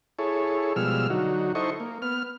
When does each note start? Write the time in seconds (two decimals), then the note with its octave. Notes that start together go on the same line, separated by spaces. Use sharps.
0.19 E4 G#4 A4 C#5
0.76 B2 F3 G3 G#3 E6 F6
1.10 D3 F#3 D#4 F#4
1.55 D#4 E4 A4 C5 D#5 C#6
1.80 A#3
2.02 B3 F6